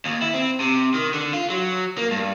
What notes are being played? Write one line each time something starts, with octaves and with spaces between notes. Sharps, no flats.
D#2
E4
C4
C3
D#3
D3
F4
F#3
A#3
G2